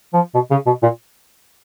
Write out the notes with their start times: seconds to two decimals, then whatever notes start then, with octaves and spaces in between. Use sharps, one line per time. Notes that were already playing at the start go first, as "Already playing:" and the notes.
0.14 F3
0.35 B2
0.51 C#3
0.66 B2
0.83 A#2